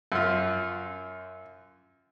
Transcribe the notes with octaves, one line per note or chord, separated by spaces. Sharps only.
F#2 F4